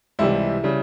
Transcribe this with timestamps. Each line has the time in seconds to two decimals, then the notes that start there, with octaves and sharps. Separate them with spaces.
0.19 C#2 C3 E3 G3 E4
0.63 C#3 G3